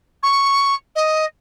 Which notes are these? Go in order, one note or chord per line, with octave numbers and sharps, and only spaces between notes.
C#6
D#5